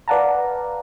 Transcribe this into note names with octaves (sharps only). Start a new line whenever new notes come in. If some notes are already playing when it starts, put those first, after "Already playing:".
B4 D5 F5 F#5 A5 A#5